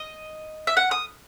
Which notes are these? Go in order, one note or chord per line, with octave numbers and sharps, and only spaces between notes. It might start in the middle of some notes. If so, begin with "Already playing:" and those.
Already playing: D#5
E5
F#5
D#6